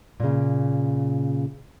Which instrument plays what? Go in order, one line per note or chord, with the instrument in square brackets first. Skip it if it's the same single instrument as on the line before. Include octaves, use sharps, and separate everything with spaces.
[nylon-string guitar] A#2 C#3